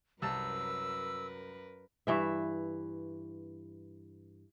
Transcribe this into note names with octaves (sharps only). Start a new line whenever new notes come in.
C2 F#2 A#4 B4 A5 E6
G2 E3 E5